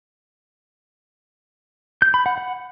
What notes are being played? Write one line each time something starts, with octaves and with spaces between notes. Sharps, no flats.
G6
B5
F#5
F#5